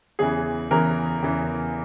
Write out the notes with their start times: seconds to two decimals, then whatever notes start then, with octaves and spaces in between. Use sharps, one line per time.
0.19 E2 C#3 E3 G#4
0.71 E2 C#3 E3 A#4
1.22 E2 C#3 E3